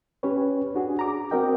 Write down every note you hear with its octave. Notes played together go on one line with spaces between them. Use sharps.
C#4 G4 B4 C#5
D4 F#4 G#4
A#5 D6
C4 F#4 A#4 D#5 G5